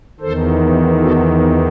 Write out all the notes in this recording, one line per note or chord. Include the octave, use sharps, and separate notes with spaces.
E2 D#3 A4 C5
F#4 A4